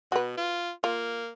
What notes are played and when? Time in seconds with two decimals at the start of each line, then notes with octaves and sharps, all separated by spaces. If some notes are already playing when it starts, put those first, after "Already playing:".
0.12 B2 F#4 B4
0.37 F4
0.84 A#3 F4